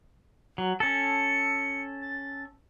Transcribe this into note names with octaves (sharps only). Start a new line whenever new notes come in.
F#3
C#4 A4 C#7
A6